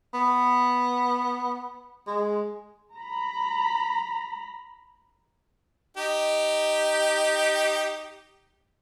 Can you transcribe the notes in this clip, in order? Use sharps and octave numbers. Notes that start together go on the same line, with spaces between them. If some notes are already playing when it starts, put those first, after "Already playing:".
B3
G#3
A#5 B5
D#4 G4